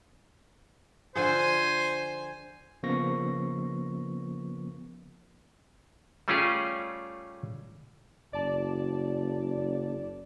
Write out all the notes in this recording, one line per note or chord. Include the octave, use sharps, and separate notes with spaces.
D3 F3 G#4 C5 G#5
C#3 F3 A#3 B3 C#6 A#6
G3 A3 C#4 F4 G4 G#4
F#1 D5 A5